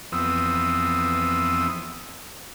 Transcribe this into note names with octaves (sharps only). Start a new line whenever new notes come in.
F2 E3 B3 C4 D#6 E6